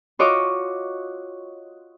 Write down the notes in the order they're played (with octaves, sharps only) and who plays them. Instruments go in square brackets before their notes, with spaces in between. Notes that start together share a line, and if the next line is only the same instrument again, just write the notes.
[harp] F4 F#4 C#5 D#5 C#6 D6